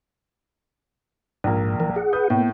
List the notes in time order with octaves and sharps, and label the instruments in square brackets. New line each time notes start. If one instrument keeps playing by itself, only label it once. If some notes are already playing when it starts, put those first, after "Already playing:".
[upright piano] A#1 A#3 [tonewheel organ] G#2
[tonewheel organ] E3 F3 A#4
G#4 F#5
[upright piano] B4 D#6 G6
[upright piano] A2 [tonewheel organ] A#3 B3